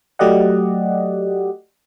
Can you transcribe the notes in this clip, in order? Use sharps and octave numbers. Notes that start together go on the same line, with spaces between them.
F#3 A3 G4 D5 D#5 F#5